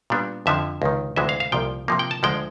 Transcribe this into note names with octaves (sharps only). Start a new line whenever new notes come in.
A#2 G3 B3 D4
F2 D3 F3 E5
C#2 C3 D#3
D2 C3 E3 G#3 E5
F5
F5
C2 A#2 F3 G5
C3 F3 A#3
G5
A5
D2 D3 F3 G#3 G5